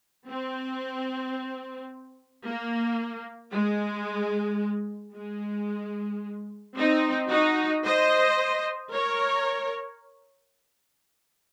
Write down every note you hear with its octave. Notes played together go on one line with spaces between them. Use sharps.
C4
A#3
G#3
G#3
C4 D#4
D#4 F#4
C5 D#5
A#4 C#5